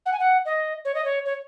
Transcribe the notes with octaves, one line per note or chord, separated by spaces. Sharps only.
F#5
G#5
F#5
D#5
C#5
D#5
C#5
C#5